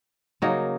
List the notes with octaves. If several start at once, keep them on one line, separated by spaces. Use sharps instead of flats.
C#3 F#3 A#3 D#4